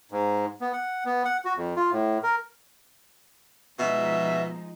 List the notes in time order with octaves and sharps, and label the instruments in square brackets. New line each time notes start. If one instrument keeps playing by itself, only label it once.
[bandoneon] G#2
B3
F#5
B3
F#5
F#4
F2
F4
A2
A#4
[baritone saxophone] B2 [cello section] F3 G#3 D#4 [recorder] E5